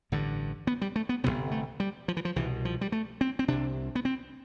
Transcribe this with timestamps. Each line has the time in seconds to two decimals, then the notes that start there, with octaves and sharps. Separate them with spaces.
0.12 A1 G2 D3
0.67 B3
0.82 G3
0.96 A3
1.09 B3
1.24 G1 F2 C3 B3
1.51 A3
1.80 G3
2.08 F3
2.17 E3
2.25 F3
2.36 C2 B2 E3
2.65 F3
2.81 G3
2.92 A3
3.21 C4
3.39 C4
3.48 C2 C3 D4
3.95 B3
4.05 C4